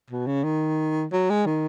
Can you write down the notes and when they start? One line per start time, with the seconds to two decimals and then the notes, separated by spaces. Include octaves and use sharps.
0.10 B2
0.27 C#3
0.44 D#3
1.12 F#3
1.30 G#3
1.46 D#3